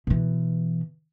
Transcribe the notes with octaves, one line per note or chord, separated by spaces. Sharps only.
B2 E3